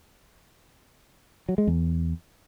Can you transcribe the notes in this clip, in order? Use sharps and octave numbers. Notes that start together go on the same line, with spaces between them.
F#3
G#3
E2